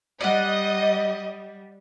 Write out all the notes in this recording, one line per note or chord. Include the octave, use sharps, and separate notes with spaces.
G3 D5 D#5 F#5